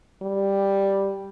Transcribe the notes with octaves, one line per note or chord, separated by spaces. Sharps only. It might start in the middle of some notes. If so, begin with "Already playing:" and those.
G3